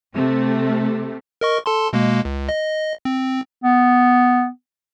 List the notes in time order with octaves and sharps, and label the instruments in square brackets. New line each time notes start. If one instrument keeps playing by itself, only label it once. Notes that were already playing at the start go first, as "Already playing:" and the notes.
[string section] C3 A3
[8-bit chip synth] A#4 D#5 C#6
A4 A5 C6
B2 G#3 A#3
C#2
D#5
C4
[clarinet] B3